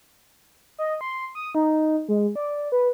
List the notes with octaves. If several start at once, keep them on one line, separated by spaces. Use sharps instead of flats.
D#5
C6
D#6
D#4
G#3
D5
B4